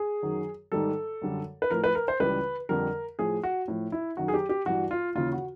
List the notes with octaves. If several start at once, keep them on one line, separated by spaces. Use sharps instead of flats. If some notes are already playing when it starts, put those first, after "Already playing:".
Already playing: G#4
F#2 D#3 F#3
G#2 D#3 G3 A4
F#2 D3 G3
B4
A2 F3 A#4
B4
A#4
C5
C#2 C#3 E3 G3 B4
F2 D3 G3 A#4
A2 F3 G#4
F#4
A2 F3
E4
F#2 D#3 F#3 F#4
G#4
G4
G4
G2 E3 G3 F#4
F4
D#2 C#3 E3 F4
F#4